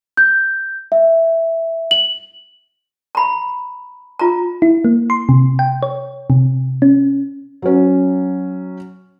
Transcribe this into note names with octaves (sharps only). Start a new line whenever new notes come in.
G6
E5
F#7
A#5 B5
F4 A#5
E4
A#3
C6
C3
G5
C#5
C3
C#4
F#3 C#4